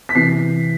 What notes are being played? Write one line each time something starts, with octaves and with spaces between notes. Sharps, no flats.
B6
C3 E3 C7